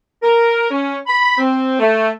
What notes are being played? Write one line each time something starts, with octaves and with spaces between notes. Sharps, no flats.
A#4
C#4
B5
C4
A3